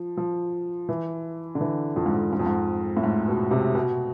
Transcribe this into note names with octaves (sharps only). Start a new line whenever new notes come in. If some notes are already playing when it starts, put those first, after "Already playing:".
Already playing: F3
F3
E3
D3
E3
F2
G#2
F2
G#2
F2
G#2
A2
G#2
B2
C3
B2